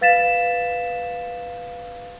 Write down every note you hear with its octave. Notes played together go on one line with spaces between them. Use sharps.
B4 F5 A6 B6 E7